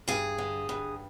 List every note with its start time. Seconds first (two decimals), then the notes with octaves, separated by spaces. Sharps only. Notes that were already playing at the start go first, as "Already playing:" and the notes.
0.08 G2 G#4
0.38 D3
0.69 G2